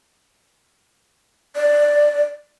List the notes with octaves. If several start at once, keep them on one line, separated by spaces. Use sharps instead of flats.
D5